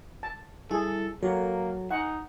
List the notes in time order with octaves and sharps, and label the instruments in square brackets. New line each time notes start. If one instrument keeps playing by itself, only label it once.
[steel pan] A5
[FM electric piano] G3 E4 [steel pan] G#4 [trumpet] A4
[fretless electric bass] F#3 [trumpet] A#3 [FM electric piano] A4
[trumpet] D#4 [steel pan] F#5 [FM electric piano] G#5